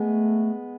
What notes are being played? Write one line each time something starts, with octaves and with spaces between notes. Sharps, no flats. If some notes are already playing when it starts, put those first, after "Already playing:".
Already playing: G#3 A3 B3